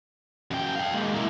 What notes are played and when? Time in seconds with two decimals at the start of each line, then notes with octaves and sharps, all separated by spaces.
0.51 F#2 G5
0.76 F5 G5
0.94 G#3 A#3
1.14 A#3 E4